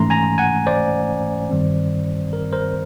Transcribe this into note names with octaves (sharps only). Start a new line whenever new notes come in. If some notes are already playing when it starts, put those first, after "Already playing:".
Already playing: G#2 E3 A3 C#4 A#5 C6
G#5 A#5
F#5 G#5
C5 D5
G2 D#3 G3 C4
A#4
A#4 C5